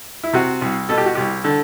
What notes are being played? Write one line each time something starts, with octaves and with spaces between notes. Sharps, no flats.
E4
C3 F#4
C2
B2 A4
G4
F#4
C2 G4
D3 A4